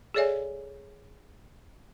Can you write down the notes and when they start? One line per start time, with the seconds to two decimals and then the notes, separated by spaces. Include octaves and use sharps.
0.14 G#4 A4 C#5 D5 E5 G#5